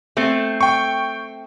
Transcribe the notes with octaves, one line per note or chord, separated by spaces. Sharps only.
A3 C4
G5 C#6